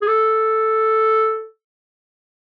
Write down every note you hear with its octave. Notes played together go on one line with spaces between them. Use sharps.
G#4
A4